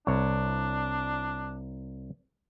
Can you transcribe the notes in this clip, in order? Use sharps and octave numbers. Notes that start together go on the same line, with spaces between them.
C2 D4 C#5